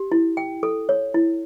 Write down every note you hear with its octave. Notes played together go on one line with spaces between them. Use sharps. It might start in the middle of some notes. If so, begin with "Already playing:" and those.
Already playing: G4
E4
G5
A4
C#5
E4